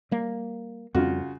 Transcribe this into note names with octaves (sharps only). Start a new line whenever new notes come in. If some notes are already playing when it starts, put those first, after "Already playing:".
G3 A#3
F2 C#3 G3 C4 F4 F#4